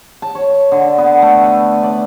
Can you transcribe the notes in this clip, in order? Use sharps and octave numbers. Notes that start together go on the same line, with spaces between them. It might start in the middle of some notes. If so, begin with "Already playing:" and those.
A5
C#5
D3
B3
A3
B4
D5